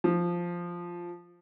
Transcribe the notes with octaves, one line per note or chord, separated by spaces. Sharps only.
F3